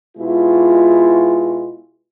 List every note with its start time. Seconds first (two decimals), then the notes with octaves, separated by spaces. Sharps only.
0.18 B2 G#3 E4 F4